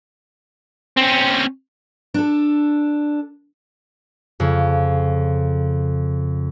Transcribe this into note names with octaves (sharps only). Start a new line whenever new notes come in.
C4 C#4
D4 A4
F2 C#3